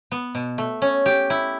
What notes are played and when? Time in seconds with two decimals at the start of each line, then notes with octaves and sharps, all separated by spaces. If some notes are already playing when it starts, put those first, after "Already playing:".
0.12 B3
0.35 B2
0.58 A3
0.82 C#4
1.06 G4
1.30 E4